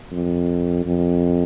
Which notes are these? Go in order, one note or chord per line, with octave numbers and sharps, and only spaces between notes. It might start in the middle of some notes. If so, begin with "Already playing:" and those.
F2
F2